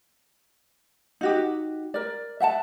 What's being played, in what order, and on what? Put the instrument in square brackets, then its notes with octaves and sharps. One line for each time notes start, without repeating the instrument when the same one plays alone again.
[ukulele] D#4 F#4 G4
A#4 D5
E5 F#5 G5 A5